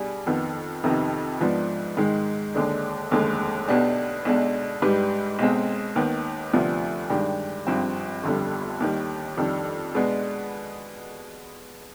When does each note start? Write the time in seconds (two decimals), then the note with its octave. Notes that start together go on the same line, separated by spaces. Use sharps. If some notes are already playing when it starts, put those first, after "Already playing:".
Already playing: B2 G3 D4 G#4
0.27 F2 D#3 B3
0.84 F2 C3 D#3 B3 D#4
1.41 G#2 F3 B3 D4
1.97 G#2 D#3 G#3
2.54 D#2 D3 G#3 D4
3.11 F1 D#2 D3 G#3
3.68 B1 B2 B3 D4 G4
4.25 B1 B2 G#3 D4
4.82 G#2 G3 D4 G4 B4
5.39 B1 B2 G#3 C4
5.96 D#2 D#3 B3
6.52 D2 C3 F3 B3 D4
7.10 G2 D#3 G#3 D4 G4
7.67 G#1 G2 F3 C4
8.24 G1 F2 D3 G3
8.80 D#2 D#3 G3
9.37 F2 D#3 G3 D4
9.95 B2 G#3 B3 D4